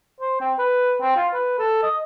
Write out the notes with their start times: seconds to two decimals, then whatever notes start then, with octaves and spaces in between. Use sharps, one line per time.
0.20 C5
0.40 C4
0.58 B4
1.01 C4
1.16 F4
1.33 B4
1.58 A4
1.82 D#5